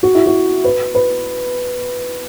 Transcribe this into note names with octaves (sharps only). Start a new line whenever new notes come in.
F#4
E4
F#4
B4
B4